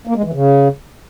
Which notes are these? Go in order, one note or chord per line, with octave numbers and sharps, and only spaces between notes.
A#3
G#3
E3
C#3